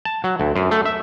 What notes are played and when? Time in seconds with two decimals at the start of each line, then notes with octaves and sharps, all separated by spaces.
0.05 A5
0.24 F#3
0.40 D2
0.56 F#2
0.71 A3
0.86 E5